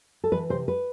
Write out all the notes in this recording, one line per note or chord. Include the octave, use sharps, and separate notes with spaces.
A4
E3 B4
C3 C5
B4